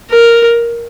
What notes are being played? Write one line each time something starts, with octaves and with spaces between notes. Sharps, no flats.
A#4